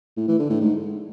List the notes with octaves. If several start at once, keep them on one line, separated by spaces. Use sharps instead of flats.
A2
E3
D3
A2
G#2